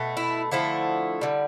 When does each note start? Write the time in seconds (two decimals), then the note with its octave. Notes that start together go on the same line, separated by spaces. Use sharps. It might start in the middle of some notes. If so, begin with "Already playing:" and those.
Already playing: B2 A3
0.17 E4
0.52 D3 F3 A3 E4
1.21 D3 G3